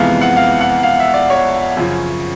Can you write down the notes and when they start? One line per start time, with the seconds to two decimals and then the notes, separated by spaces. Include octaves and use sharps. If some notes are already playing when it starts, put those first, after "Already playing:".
Already playing: F2 C3 E3 G#3 B3 F5
0.21 F#5
0.37 F5
0.61 F#5
0.83 F5
0.99 E5
1.14 D5
1.30 C#5
1.77 F#2 C#3 F3